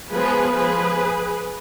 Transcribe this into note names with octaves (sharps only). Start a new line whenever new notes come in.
F3 G#3 B3 G#4 B4
F3 G#3 B3 G#4 B4